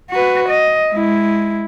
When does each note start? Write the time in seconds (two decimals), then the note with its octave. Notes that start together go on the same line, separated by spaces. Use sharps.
0.10 F#4 B4
0.48 D#5
0.93 G#3 E4